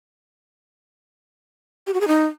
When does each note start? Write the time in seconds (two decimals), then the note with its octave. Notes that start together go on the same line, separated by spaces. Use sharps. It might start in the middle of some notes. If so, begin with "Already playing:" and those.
1.87 G4
1.94 F#4
2.01 G#4
2.08 D#4